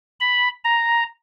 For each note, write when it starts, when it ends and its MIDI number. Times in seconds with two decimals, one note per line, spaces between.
0.20 0.48 83
0.65 1.04 82